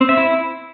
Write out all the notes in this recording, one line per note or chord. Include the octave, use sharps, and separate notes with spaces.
C4
E5
E4